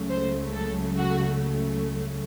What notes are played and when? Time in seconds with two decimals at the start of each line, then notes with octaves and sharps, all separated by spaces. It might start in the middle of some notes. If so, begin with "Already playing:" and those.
Already playing: C#2 C#3 F#3 A3
0.10 C5
0.53 A4
0.97 F#4